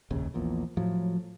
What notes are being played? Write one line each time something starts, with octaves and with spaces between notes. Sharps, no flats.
F1 A#1 D#2 C#3
A#1 E2 A#2
A2 F3 F#3